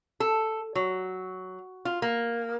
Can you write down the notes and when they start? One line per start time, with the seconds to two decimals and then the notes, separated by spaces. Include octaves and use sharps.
0.20 A4
0.75 F#3
1.85 F4
2.02 A#3